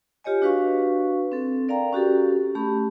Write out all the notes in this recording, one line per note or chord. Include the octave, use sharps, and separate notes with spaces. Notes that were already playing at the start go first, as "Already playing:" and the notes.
F4 G4 C#5 D#5 G#5
D4 F#4 B4 F5 C#6
C4 A4
A#4 D5 F5 G5 A#5
C#4 F#4 G4 A4
A3 C#4 G4 B5